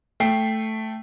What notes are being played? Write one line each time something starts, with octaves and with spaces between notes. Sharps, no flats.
A3 G5 C7